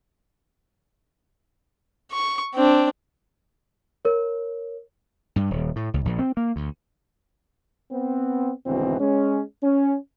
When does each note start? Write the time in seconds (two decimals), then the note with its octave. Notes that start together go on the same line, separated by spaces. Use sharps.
2.12 C#6
2.55 C4 D4
4.05 A#4 C#5
5.36 G2
5.50 D#1
5.76 A2
5.94 C#2
6.05 A#1
6.19 C4
6.37 A#3
6.56 D2
7.92 B3 C4
8.66 G#1 D2 B2 E3 C4
9.00 G#3 C#4
9.63 C#4